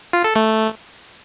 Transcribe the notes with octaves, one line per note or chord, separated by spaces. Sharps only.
F4
A4
A3